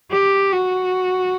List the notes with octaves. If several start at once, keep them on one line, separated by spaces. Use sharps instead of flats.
G4
F#4